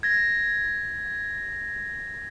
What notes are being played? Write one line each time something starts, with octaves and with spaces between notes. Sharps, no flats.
G#6 A#6